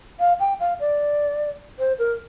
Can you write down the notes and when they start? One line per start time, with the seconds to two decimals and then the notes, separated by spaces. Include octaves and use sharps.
0.19 F5
0.40 G5
0.60 F5
0.80 D5
1.79 C5
1.99 A#4